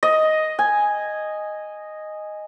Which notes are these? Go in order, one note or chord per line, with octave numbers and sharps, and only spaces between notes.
D#5
G#5